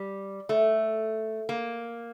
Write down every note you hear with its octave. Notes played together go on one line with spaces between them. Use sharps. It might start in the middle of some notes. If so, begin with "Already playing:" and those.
Already playing: G3
A3
A#3